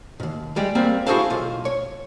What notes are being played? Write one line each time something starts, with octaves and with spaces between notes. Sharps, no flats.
D#2 G#2
G3 G#3 G4
G3 A#3 C4 G4
E4 F#4 G#4 A4 C5 F5
B1 F4
C#5